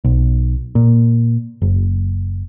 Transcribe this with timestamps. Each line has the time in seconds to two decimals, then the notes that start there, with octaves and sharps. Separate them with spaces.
0.04 B1
0.75 A#2
1.62 F#1